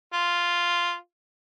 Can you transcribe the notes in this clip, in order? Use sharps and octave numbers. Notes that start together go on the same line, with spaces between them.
F4